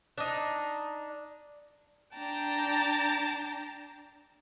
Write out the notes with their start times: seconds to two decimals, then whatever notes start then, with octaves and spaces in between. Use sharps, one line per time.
0.18 D4 D#4
2.16 D4 G5 A5 A#5